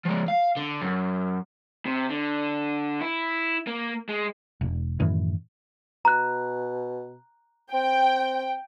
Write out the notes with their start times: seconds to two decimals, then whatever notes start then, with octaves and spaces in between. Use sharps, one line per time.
0.06 F3 G#3
0.28 F5
0.57 D3
0.82 F#2
1.86 C3
2.09 D3
3.01 E4
3.67 A#3
4.09 G#3
4.61 E1
5.00 F#2 A2 D#3 E3
6.05 B2 A#5 F#6
7.73 C4 G5